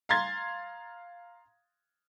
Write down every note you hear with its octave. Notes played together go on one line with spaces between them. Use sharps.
F5 A#5 C6 G#6 A6